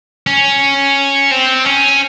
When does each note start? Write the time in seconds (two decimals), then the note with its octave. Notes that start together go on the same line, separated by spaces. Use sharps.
0.27 C#4
1.31 C4
1.65 C#4